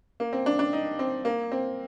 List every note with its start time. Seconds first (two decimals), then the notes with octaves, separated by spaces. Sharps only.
0.20 A#3
0.33 C4
0.46 D4
0.59 D4
0.73 D#4
0.99 C4
1.25 A#3
1.52 C4